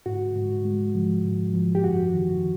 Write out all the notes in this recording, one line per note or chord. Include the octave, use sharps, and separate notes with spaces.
G#2 F#4
G#2
G#3
F3
G#2
F3
G4
F#2 F#4
D#3